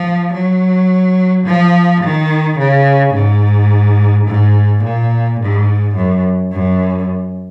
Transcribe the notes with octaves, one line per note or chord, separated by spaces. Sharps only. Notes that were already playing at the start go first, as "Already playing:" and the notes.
Already playing: F3
F#3
F3
D#3
C#3
G#2
G#2
A#2
G#2
F#2
F#2